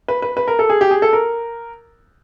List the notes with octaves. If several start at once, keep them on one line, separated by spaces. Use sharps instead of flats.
B4
B4
B4
A#4
A4
G#4
G4
G#4
A4
A#4